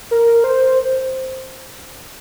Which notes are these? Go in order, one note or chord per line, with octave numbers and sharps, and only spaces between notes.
A#4
C5